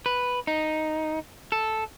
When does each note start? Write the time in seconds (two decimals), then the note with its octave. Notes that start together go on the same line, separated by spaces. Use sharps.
0.06 B4
0.47 D#4
1.52 A4